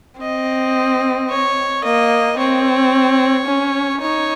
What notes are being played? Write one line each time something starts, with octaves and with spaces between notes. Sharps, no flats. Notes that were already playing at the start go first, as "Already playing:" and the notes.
C4 D#5
C#5
A#3 D#5
C4 C#5
C#4
D#4 C#5